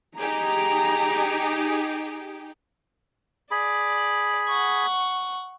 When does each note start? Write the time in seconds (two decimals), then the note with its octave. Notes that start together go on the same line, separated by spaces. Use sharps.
0.18 D#4 G4 G#4 A#5
3.51 G#4 D5 B5
4.48 F#5 C#6